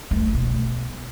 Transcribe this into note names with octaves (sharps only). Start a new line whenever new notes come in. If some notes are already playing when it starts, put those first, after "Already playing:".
A3
B2